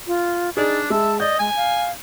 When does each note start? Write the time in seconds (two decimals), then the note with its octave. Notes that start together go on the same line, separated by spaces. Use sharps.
0.07 F4
0.57 D4 D#4 G#4 D5
0.90 G#3 E5 A5
1.20 D5 D#5 G6
1.39 G#3 G#5
1.56 F5